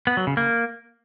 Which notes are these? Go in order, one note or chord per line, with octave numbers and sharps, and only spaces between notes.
B3
F#3
C#3
A#3